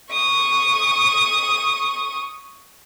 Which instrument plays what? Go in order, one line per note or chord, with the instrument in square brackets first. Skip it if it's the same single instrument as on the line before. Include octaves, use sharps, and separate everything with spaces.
[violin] C#6 D#6